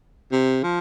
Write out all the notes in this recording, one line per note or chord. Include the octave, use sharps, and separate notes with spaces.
C3
F3